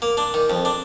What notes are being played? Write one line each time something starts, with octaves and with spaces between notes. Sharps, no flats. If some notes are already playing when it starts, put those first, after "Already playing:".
A#3
D4
D#3
F2
D4